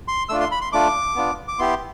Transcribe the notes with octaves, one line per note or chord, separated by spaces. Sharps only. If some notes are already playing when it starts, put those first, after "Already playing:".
C6
A3 D4 F4 E6
C6
B5
C6
A3 D4 F4 D6
B3 D4 F4
D6
B3 E4 G4 C6